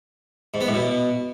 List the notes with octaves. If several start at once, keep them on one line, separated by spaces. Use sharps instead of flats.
G#2
B3
A2
B2